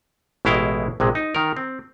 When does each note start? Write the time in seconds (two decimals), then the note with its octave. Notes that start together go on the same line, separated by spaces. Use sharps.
0.45 A1 B2 G#3 E4 F5 G5
1.00 A#1 C3 G#3
1.15 D#4
1.35 D#3 A#4
1.57 C4